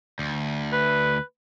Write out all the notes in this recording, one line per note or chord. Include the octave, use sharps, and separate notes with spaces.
D2
B4